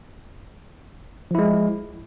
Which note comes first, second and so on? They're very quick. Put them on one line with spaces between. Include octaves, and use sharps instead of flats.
F3 E4 G#3